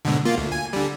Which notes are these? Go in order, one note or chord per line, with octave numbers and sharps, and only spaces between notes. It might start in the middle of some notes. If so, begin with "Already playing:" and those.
G#2 B2 D3
A#3 F4
D2
G#5
D3 G3